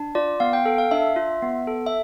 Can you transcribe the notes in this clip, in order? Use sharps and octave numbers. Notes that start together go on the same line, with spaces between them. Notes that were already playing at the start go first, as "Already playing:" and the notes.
Already playing: D4
F4 D5
B3 F5
G5
A4
F5
D4 E5
F4
B3
A4
E5